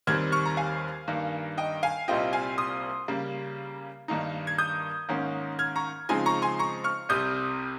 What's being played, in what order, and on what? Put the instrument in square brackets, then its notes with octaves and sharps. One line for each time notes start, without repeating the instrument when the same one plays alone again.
[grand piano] D#2 D#3 G3 C4 F6 G#6
C#6 F6
A#5
F5 G#5
G2 D#3 A#3
D#5 G5
F5 G#5
C2 A#2 G3 C4 F4 D#5 G5
F5 G#5
C6 D#6
C#3 G3 A#3
G2 D#3 A#3 D#4
G#6
D#6 G6
G#2 D#3 A#3 C#4
F6 G#6
A#5 C#6
C#3 F3 G#3 C4 D#4 G#5 C6
A#5 C#6
G#5 C6
A#5 C#6
C#6 F6
C2 C3 G3 D#6 G6